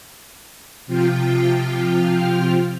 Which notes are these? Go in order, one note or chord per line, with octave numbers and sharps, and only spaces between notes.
C3 F3 F4 G5 F6